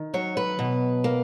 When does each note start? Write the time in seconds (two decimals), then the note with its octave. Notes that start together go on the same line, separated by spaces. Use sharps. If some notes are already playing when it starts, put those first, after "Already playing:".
Already playing: D#3
0.14 F#3 C#5
0.37 B4
0.59 B2
1.04 A#3